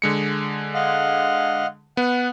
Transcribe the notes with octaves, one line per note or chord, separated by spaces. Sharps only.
D3 G#3 C#7
D#5 F5 F#5
B3 F#5